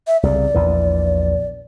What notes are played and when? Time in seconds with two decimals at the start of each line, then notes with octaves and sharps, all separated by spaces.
0.07 E5
0.23 C2 C#3 D5
0.54 A#1 E2 E3